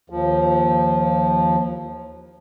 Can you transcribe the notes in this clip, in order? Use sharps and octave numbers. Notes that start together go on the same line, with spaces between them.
D#2 F3